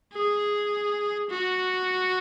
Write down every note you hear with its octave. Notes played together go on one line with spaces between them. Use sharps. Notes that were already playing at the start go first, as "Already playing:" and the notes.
G#4
F#4